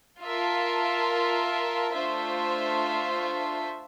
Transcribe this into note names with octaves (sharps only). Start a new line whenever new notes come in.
F4 A#4 E5 A5
A3 D4 F4 C5 E5